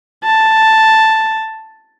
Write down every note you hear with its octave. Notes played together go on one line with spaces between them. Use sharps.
A5